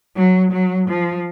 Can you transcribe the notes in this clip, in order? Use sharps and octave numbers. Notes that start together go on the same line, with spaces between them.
F#3
F#3
F3